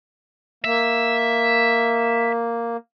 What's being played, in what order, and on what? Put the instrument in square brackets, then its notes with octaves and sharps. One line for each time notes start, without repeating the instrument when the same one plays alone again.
[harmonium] A#3 [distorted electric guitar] E5